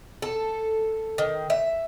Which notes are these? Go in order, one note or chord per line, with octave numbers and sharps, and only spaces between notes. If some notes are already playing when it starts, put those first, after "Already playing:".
A4
D#3
E5